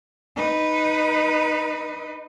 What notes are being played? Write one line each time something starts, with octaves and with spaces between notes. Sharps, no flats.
D#4 B4